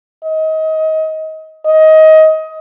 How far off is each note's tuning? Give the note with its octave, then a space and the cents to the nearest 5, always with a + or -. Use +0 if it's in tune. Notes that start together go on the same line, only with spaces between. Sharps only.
D#5 +25
D#5 +20